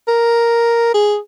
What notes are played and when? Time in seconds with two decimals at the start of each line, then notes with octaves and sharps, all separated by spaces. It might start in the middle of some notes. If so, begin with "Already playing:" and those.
0.08 A#4
0.94 G#4